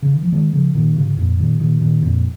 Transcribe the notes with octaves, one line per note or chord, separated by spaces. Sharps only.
C#3
D#3
F3
D#3 G#3
C#3 F3
A#2 D#3
G#2 C#3
C#3
F2 A#2
A#2 D#3
A#2 D#3
A#2 D#3
F2 A#2